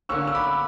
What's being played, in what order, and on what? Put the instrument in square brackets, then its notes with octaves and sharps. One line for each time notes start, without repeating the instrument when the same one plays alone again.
[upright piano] D3 A#3 C#4 [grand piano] C#6 E6
[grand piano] E6
B5 D6